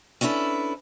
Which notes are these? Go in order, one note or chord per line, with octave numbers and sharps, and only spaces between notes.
C#4 D4 E4 A4 B4